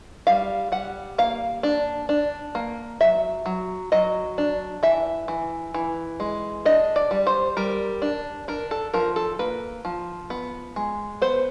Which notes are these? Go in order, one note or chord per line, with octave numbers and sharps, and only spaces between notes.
G3 F5
G3 F#5
A#3 F5
D4
D4
A#3
F#3 E5
F#3
F#3 D#5
D4
E3 E5
E3
E3
G#3
D4 D#5
D5
G3
C5
G3 A#4
D4
D4 A#4
A4
F3 A#4
A4
A#3 B4
F3
B3
G#3
B3 C5